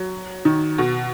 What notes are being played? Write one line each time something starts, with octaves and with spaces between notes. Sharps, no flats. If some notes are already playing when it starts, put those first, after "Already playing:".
Already playing: F#3
D#3
B2